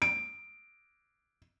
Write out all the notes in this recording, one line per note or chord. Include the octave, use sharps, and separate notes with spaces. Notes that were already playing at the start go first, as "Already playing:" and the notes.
D7